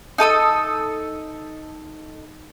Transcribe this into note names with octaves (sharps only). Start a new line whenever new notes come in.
D#4 A4 D#6 E6